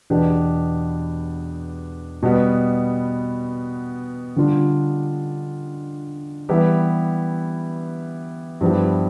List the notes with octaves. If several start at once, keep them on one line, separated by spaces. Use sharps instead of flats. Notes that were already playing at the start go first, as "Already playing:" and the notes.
E2 B2 B3 D4 G4
B2 G3 B3
D3 G3 D4 F4
E3 G3 B3 E4 G4
G2 F3 B3 E4 G4